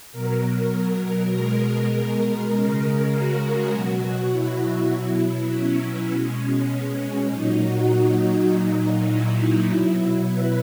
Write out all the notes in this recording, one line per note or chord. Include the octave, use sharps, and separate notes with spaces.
B2 F#3 A#4
B2 G#3 A#4
C#3 G#3
F#4
B2 F#3
E4
B2 F#3
C#4
B2 G#3
C#4
A#2 F#3 D#4
F#4
D#4
A#2 F#3 D#4
E4
B2 F#3
B4